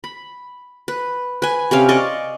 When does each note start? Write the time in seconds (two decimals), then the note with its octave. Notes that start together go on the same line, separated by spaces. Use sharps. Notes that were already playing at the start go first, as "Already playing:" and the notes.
0.04 B5
0.88 B4
1.42 B4 G#5
1.71 C3 C4 C#4 F5
1.89 D5 D#5 C#6